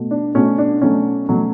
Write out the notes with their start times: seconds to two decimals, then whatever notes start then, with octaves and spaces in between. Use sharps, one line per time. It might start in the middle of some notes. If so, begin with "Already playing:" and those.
Already playing: B2 A3
0.11 D4
0.35 B2 A3 C#4
0.58 D4
0.81 B2 F#3 A3 C#4
1.29 B2 F#3 A3